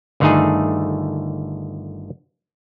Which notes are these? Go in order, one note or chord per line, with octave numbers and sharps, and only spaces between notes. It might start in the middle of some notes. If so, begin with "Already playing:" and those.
G1 D3 D#3 A3 D#4 G#4